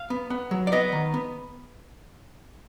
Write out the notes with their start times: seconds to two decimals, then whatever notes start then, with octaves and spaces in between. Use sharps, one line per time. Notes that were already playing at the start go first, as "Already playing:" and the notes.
Already playing: F5
0.10 B3
0.30 B3
0.51 F#3
0.67 D5
0.72 B3 D#5
0.92 D#3
1.14 B3